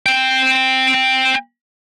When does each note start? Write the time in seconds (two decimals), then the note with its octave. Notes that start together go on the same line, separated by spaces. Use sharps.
0.06 C4 G5